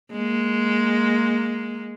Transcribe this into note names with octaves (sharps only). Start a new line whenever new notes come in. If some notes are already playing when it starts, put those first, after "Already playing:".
G#3 A#3